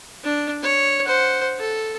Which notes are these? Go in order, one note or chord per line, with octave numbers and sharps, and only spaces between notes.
D4
C#5
C5 F#5
A4